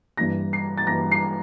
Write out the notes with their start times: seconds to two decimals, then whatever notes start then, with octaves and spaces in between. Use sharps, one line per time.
0.17 G2 E3 A#3 A#6
0.53 C7
0.78 A6
0.87 G2 E3 A#3 A#6
1.11 C7